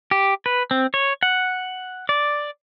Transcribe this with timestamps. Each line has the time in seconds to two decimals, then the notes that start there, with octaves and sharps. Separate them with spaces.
0.11 G4
0.46 B4
0.71 C4
0.94 C#5
1.23 F#5
2.09 D5